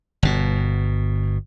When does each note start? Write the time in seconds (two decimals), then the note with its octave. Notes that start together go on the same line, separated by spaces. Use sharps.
0.23 G1 B2